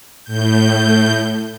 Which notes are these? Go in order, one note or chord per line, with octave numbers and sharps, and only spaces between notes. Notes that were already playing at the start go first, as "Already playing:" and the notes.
A2 G6